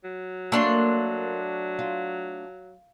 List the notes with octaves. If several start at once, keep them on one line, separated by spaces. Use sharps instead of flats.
F#3
A3 A#3 D4 C6
F4